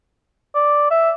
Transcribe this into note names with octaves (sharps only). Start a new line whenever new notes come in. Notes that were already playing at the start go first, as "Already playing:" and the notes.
D5
E5